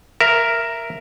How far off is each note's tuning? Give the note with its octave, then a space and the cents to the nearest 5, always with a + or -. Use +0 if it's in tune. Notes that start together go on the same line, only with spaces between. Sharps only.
A#4 +0 E5 +10